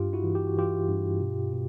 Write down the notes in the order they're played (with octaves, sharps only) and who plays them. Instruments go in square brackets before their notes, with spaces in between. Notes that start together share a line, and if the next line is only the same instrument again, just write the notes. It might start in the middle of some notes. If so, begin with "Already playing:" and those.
Already playing: [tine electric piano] G2 F4 G4
E4 F#4
E3
G4
F#4
E3 F4 G4
G2
B2
B2